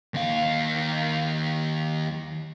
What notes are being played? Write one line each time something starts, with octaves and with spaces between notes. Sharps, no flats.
D#2 F5